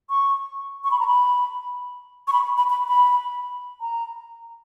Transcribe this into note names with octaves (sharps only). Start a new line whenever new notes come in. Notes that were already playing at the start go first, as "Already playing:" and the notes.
C#6
C#6
B5
A#5
B5
C#6
B5
B5
B5
B5
A#5